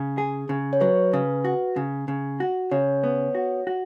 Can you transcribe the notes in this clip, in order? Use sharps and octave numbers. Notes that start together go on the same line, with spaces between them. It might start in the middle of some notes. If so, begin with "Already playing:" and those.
Already playing: C#3
G#4
C#3
C#5
F#3 B4
C#3
F#4
C#3
C#3
F#4
C#3 C#5
B3
F#4
F#4